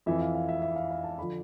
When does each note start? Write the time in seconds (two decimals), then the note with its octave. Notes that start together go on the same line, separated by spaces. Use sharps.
0.06 F2 E3 E5
0.21 F5
0.35 F5
0.49 E5
0.62 E5
0.76 F5
0.91 F5
1.04 A5
1.19 D3 F3 B5